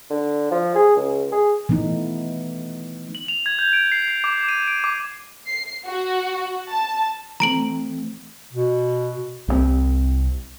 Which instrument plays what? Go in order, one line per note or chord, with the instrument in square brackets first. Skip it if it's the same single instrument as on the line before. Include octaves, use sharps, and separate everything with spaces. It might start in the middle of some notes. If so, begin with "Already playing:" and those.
[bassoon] D3
F3
G#4
C#2
G#4
[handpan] E3 A3 B3 D#4
[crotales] F#7
F7
G#6
G6
D7
C7
C7
D6
D#7
D7
D6
[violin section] C7
F#4
A5
[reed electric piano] E3 A3 C4 [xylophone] A#5 D7 F#7
[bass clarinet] B2
[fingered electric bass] C2 F3 C4